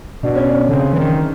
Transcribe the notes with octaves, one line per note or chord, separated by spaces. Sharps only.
B2 D4
C#4
D4
D3
C#3 C4
E3
D#3